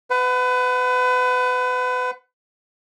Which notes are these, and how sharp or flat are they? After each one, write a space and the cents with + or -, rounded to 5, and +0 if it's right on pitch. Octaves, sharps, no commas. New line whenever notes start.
B4 +30 F#5 -10